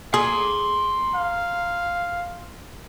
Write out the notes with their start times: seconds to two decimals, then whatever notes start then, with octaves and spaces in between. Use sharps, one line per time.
0.14 G#4 A#5 C6
1.16 F5